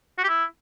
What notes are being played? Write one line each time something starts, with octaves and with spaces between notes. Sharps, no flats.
F#4
G4
E4